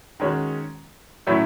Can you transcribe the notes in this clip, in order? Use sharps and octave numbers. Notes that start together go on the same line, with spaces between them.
D#3 G#3 C#4 F#4
A2 F#3 A3 C#4 E4